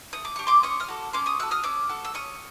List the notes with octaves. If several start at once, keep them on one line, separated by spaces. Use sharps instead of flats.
A3 D#6
D6
D4 G4 C#6
C6 D6
C#4 C#6 D#6
D#6 F6
F#4 A4
C#4 C6 D6
C#6 D#6
F#4 A4 E6 F#6
D#6 F6
C#4 D6 E6
F#4 A4
E6
C#4 C#6 D#6